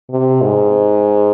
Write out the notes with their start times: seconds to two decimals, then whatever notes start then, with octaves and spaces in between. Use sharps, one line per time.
0.10 C3
0.43 G#2